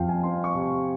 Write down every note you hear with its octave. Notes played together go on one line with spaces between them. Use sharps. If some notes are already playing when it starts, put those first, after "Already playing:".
Already playing: F2 F3 F5 G5
G#5
C4 C6
C#6
C3